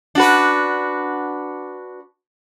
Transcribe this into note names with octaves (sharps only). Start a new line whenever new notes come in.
D4 F#4 B4